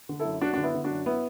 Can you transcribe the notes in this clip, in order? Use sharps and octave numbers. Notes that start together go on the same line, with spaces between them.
D3
E4 A4
F#2
F#2 D4 F#4
D3 D4
B3 E4
D3
D4 F#4
F#2
B3 E4